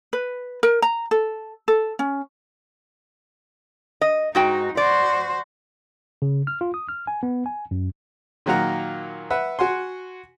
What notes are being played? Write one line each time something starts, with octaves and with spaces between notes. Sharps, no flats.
B4
A#4
A#5
A4
A4
C#4
D#5
G#2 D#4 F#4 G5
F#4 C5 D5
C#3
F6
F4
D#6
F6
G#5
B3
G#5
F#2
A#2 D#3 F#3 A#3 F#5 A#5
B4 E5 F#5
F#4 F#5 G#5 C6